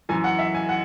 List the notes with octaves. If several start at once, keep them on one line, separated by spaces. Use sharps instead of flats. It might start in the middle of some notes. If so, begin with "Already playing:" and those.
F#2 E3 G#5
F#5
E5
G#5
F#5